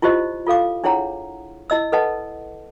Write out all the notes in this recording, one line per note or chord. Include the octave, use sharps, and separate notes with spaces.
E4 F4 G4 C5 D#5
F4 A4 F5 D6
D4 E4 G#4 C#5 F#5 A#5
E4 D#5 E6
A4 B4 D#5 F#5 A5